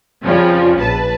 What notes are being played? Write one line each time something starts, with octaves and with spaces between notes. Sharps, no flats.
F2 C#3 F3 G3
A#1 B4 A5